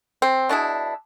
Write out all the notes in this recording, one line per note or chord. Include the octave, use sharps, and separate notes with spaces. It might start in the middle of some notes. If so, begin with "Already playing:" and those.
C4
B2 D4 E4 G#4